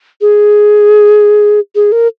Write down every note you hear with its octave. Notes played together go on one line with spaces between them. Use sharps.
G#4
G#4
A#4